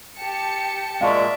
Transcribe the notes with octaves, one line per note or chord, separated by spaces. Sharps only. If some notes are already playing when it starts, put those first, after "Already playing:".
G4 A5 C#7
A#2 G#3 D5 E5 F5 A5 C#6